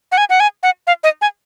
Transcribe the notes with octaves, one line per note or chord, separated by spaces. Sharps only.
F#5
G#5
F#5
G#5
F#5
F5
D#5
G#5